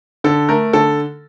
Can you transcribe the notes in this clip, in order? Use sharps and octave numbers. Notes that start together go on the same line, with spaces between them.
D3 A4
A3 A#4
D3 A4